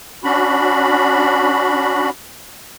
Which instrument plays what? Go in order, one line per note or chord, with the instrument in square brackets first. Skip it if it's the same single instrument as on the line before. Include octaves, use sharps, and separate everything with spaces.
[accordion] C#4 D4 F#4 B5